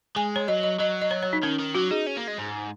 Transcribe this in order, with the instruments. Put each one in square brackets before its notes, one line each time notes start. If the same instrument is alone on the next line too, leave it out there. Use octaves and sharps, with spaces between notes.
[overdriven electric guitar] G#3 [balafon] G#5
[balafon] C#5
[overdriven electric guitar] F#3 [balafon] D#5
[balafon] D#5
[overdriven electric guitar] F#3 [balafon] D#5
[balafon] D#5
C#5
C#5
D#4
[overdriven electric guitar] D#3 [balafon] C#4
[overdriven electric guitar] D#3
[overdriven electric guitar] F#3 [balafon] F#4
[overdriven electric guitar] D#4 [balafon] G#4
[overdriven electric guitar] C#4
A#3
G#3
G#2